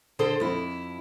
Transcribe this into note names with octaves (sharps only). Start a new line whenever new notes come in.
D3 G#4 A4 C5
F2 E4